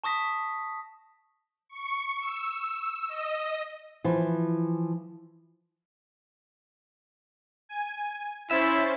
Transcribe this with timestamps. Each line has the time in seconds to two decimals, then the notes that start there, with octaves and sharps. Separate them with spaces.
0.04 A5 C#6 D#6 A#6 B6
1.69 C#6
2.21 E6
3.08 D#5
4.04 E3 F3
7.69 G#5
8.51 C#4 E4 C5 E5 A6